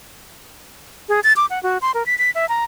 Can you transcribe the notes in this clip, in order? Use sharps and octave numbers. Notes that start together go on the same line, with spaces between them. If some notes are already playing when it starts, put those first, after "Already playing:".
G#4
A6
D6
F#5
F#4
C6
A#4
B6
B6
E5
A#5